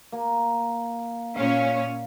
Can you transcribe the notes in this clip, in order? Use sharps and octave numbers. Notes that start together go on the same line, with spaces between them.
A#3
A#2 C#4 C#5 F5